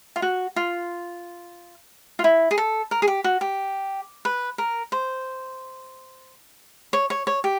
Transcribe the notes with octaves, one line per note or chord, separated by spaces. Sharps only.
F4
F#4
F4
F4
E4
G#4
A4
A#4
G#4
G4
F#4
G4
B4
A#4
C5
C#5
C#5
C#5
G4